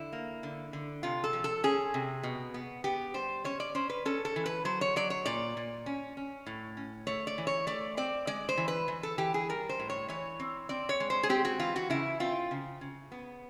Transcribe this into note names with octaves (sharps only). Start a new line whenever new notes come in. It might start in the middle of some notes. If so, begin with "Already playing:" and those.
Already playing: D3 E4
A#3
D3
D3
C3 F4
A4
F3
A4
C#4 G#4
C3
B2
B3
B3 G4
G3 C5
C#4 C#5
D5
C#4 C5
B4
C#4 A4
A4
E3
B4
F#3 C5
C#5
F#3 D5
C#5
A#2 D5
A#2
C#4
C#4
A2
C#4
A3 C#5
D5
E3
C#5
A3 D5
C4 D5
G#3 D5
C5
E3
B4
E3
A4
E3 G4
G#4
G3 A#4
C5
A2
C#5
E3 C#5
C4
C4 D5
C#5
G#3
C5
G#4
C4 G4
F#4
E3 F4
F#4
C#3 E4
C4 F4
C#3
C#3
B3